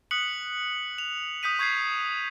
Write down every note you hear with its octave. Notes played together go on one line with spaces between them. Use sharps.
D#6 F#6 B6 C#7 F#7
F7
D#6 G6 B6 D#7
C#6 G6 G#6 B6 C7